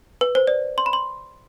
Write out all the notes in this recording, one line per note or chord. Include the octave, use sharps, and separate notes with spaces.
B4
C5
D5
C6
B5
C6